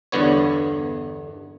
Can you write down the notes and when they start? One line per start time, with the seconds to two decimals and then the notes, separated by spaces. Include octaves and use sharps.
0.12 G1 E2 G2 D3 B3 C#5